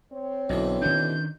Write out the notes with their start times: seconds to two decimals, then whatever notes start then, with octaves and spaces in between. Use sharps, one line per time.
0.12 C4 C#5
0.49 B1 B2 D3 E3
0.82 D#3 C#4 D4 G6